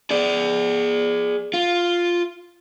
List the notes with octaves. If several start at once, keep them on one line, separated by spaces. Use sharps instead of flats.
G#4 D5
F4